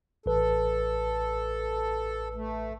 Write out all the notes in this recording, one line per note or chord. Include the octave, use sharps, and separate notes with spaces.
A1 A4 B4
A3